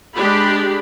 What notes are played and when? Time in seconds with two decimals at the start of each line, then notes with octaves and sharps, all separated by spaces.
0.15 G#3 D4 G4 B5